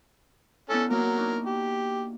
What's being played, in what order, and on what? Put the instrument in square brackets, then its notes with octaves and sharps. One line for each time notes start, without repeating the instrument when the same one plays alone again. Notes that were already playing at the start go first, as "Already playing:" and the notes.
[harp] B3 D4 E4 [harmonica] C#4 A4
[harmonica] F#3 A#4 [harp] A#3
[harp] D4 D#4 F#4
[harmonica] G4